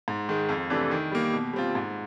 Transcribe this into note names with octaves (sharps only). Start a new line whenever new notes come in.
G#2
D#3 G#3
F2
C3 E3 A3 D4
D#3
G3 A#3
B2
G3 C4 F4
G#2